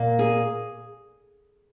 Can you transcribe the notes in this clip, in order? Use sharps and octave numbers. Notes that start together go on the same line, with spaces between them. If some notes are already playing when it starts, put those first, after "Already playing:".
Already playing: A#2 A#3
G#4